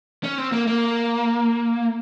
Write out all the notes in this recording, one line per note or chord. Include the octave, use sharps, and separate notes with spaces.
C#4
C4
A#3
A#3